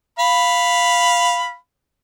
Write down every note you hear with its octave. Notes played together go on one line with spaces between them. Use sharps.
F5 B5